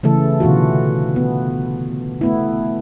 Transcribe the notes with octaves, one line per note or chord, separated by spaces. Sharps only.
C#3 E3 A3 A4
B2 D3 E3 F4 F#4
B3
A3 B3 E4